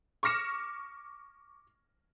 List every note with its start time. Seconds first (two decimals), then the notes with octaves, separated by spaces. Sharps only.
0.23 C#6 D6 F6 A#6 C#7 E7